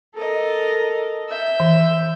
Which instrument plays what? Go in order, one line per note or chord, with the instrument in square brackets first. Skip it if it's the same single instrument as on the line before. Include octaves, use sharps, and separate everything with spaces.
[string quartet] A4 A#4 D#5
E5 G6
[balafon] E3